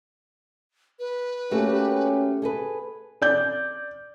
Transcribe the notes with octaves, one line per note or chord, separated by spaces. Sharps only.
B4
A3 A#3 C#4 F#4 G4
G#4 A4 B4
D5 G6